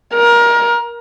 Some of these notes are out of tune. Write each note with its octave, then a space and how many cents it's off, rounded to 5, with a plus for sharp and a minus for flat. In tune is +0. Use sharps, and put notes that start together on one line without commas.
A#4 +25